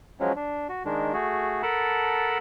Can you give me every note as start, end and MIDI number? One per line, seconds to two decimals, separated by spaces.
0.20 0.32 53
0.20 0.32 54
0.20 0.32 56
0.20 0.32 61
0.36 0.68 62
0.69 0.83 66
0.85 1.13 51
0.85 1.13 56
0.85 1.13 62
1.13 1.62 57
1.13 1.62 66
1.13 1.62 68
1.63 2.38 69
1.63 2.38 70
1.63 2.38 78
1.63 2.38 81
1.63 2.38 83